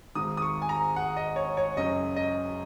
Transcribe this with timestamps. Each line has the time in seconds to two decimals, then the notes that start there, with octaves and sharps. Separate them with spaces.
0.15 G#1 G#2 D#3 D#6
0.37 D#6
0.42 C#6
0.62 G#5
0.69 A#5
0.96 F#5
1.17 D#5
1.36 C#5
1.57 C#5
1.76 F#1 F#2 C#3 F#3 D#5
2.16 D#5